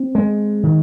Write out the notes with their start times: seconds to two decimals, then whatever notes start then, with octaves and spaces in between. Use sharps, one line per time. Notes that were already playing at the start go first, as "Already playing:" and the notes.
Already playing: C4
0.15 G#3
0.63 D#3